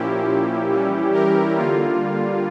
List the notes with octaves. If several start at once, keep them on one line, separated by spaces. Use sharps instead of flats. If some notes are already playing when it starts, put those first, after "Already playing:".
Already playing: A#2 F3 A#3 C#4 E4 G4
E3 G3 C#4
G4 A#4
D3 G3 A#3 F4